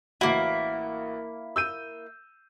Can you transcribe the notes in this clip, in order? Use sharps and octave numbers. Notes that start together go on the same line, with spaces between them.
A1 A#3 E4 F#4
E6 G6 D#7